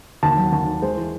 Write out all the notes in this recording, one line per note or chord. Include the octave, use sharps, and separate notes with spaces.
D#2 A5
F#3
D#2 A5
D#3
G#3 C5
E3